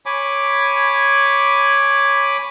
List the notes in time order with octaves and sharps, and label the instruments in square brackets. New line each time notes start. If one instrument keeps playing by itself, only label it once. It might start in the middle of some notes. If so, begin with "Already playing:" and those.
[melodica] C#5 G#5 B5 D6